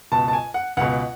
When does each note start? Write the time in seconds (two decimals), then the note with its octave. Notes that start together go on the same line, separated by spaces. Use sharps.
0.12 C#2 B2 A5
0.28 A5
0.33 G#5
0.54 F#5
0.77 C#2 B2 F#5